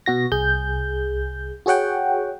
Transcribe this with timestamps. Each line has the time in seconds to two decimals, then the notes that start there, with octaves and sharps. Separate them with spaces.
0.06 B2 F#4 A#6
0.32 C2 G#4 G6
1.66 F#4 G#4 C#5 F#5 G5